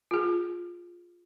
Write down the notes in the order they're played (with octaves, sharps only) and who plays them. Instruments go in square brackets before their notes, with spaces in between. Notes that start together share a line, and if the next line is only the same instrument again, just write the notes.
[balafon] F4 G#4